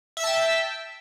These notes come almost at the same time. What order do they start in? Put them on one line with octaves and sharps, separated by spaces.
E5 E6 A5 G5